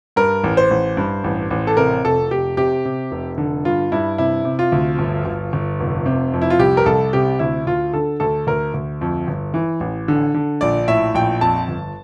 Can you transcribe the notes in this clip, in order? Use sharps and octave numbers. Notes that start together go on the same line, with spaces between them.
G2 A#4
A1
C5
A1
G2
A1
A1
A4
C3 A#4
F1 A4
F1 G4
C3 G4
C3
F1
D3
G2 F4
G2 E4
C3 E4
C3
F4
D2
G1
G1
G1
F1
C3
F2
E4
F4
C2 G4
A#4
C2 A4
C3 G4
D2 E4
D2 F4
D3 A4
D2 A4
D2 A#4
D2
F2
G1
E3
A1
D3
D3
A#1 D5
A2 E5
A#1 G5
F2 A5
G1